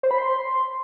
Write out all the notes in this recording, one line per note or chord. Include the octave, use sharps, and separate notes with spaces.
C5
B5
C6